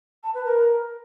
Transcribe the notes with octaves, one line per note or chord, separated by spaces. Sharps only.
A5
B4
A#4